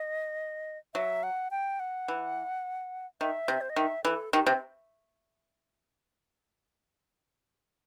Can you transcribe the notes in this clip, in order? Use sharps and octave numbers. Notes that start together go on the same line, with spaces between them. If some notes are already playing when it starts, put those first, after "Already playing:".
Already playing: D#5
F#3 E5
F#5
G5
F#5
E3
D#3 E5
C3
C5
D#5
D#3 E5
E3 A4
D#3 G4
C3 C4